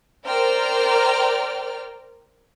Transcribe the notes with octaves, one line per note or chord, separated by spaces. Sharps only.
A#4 C5 D5 G5 A#5 F6